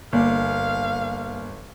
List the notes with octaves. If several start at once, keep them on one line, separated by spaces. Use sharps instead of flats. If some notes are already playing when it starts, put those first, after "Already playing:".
G1 A#3 D5 F5